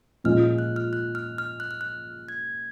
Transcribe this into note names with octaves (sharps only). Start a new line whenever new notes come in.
A#2 F3 G#3 C#4 F4 F6
F#6
F6
F#6
F6
F6
F#6
F6
F#6
G#6